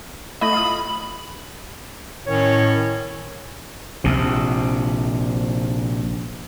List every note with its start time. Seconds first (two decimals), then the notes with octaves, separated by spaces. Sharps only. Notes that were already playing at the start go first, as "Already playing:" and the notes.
0.41 A3 E4 D#5 B5
0.53 F4 D#6
2.27 A2 D#3 C#4 C#5
4.04 A#1 C3